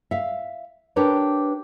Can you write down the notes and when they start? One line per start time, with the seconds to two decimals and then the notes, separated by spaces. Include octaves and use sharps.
0.11 E5 F5
0.96 D4 G4 A#4 B4 C#5